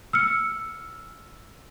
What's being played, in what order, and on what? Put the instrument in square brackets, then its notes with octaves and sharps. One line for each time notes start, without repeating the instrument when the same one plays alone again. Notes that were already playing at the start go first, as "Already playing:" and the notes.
[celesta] E6 F6 C#7